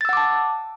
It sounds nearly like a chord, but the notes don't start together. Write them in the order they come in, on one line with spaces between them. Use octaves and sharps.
A6 E6 F#5 D6 A5